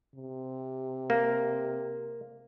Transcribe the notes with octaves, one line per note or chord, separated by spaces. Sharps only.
C3
A#3